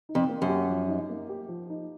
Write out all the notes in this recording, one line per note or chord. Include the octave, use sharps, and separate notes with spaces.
D#4
F2
A#3
F#2
G4
F3
D#4
A#3
G4
F3
D#4